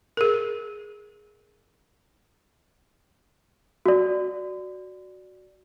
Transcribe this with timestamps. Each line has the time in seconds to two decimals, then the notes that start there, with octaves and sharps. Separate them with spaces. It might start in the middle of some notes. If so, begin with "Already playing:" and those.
0.17 G#4 A#4
3.86 F#4 D5